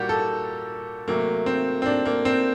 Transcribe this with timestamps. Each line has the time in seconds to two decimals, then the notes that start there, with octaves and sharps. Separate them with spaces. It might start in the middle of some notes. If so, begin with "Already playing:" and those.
Already playing: A#2 G3 A#3 F#4 G4
0.09 A4
1.08 C3 F#3 A3 A#3
1.46 C4
1.82 C4
1.86 D4
2.06 A#3
2.25 C4